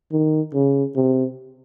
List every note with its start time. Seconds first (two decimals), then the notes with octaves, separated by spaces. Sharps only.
0.12 D#3
0.54 C#3
0.96 C3